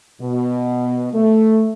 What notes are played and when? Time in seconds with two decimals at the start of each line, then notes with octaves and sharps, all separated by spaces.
0.21 B2
1.13 A3